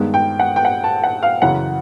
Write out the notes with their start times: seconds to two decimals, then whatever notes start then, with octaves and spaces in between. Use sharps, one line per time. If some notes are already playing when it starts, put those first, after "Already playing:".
Already playing: G2 D#3 G#3 B3
0.14 G5
0.39 F#5
0.56 G5
0.65 F#5
0.84 A5
1.04 F#5
1.23 F5
1.42 F#2 C#3 E3 F#5